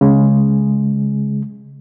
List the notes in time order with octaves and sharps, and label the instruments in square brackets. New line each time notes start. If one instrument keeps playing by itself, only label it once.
[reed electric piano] C#3 G#3